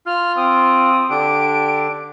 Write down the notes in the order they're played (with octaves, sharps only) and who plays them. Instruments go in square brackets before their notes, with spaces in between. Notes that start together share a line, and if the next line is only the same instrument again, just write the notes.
[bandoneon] F4 [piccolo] F6
[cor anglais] C4 [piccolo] D#6
[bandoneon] D3 D4 [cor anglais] G4 [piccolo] D7